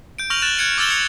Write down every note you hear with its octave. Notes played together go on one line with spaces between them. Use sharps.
G6 D7
C#6 F6 G6 A#6 F7 F#7
F#6 A6 E7 F#7
F#6 G#6 C#7 D7
D6 E6 F6 A6 E7 G7
G#6 C#7 F7